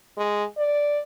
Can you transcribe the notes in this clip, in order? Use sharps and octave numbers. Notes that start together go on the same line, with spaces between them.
G#3
D5